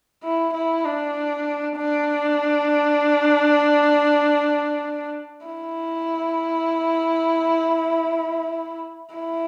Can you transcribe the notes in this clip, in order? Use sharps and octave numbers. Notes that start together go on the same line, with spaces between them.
E4
E4
D4
D4
E4
E4